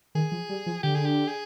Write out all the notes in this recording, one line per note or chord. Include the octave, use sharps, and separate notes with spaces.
D#3 G#4
F3
G3
F3
D3 G4
G#4
G4
G#4